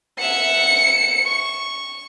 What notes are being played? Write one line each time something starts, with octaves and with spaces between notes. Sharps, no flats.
E5 F#5 C#7
C#6